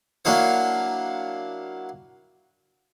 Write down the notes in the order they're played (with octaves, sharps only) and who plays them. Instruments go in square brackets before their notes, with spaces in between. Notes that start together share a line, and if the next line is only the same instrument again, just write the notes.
[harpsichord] F#3 A#3 D4 E4 C#5